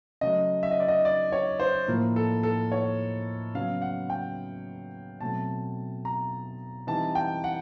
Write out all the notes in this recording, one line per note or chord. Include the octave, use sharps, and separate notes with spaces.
C#3 F#3 A3 D#5
E5
D#5
D5
D#5
D5
C#5
C5
A2 F3 A#3
A4
A4
C#5
C#3 F#3 B3 F5
F#5
G5
B2 F#3 A3 C4 A5
A#5
E3 G3 C4 D#4 A5
G5
F#5